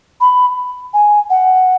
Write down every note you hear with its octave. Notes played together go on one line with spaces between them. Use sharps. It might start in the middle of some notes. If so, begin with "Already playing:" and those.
B5
G#5
F#5